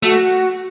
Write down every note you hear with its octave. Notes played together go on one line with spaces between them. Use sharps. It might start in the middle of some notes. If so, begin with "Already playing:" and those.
A3 F#4